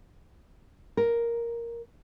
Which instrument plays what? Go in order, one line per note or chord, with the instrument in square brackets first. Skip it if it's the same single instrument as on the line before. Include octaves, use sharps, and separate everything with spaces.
[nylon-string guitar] A#4